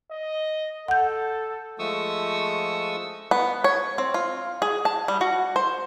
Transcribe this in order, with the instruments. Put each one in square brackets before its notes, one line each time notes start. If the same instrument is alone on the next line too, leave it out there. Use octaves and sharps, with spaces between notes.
[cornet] D#5
[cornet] A4 [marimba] F#5 G6
[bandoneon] F3 G#3 A3 C#6 D#6 E6
[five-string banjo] B3
C#5
C4
F4
G#4
A5
G3
F#4
C5